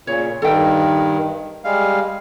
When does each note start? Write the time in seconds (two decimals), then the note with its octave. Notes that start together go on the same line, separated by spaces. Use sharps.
0.07 A#2 C#3 C#5
0.42 G2 D#3 A4 G5
1.64 G3 G#3 F5